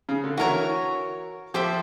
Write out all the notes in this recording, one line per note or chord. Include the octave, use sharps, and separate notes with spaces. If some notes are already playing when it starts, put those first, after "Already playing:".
C#3
D3
E3 F#4 A#4 C#5
F3 G4 C5 E5